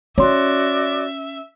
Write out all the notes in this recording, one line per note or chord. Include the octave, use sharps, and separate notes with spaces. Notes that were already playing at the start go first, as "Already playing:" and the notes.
C#4 F#4 C#5 D5 E5 C6 D6